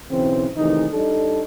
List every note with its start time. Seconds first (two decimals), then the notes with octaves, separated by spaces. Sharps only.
0.11 B1 C#3 E3 C4
0.57 C3 D#3 E3 G#3 A3 D#4
0.92 G3 D4 D#4 A4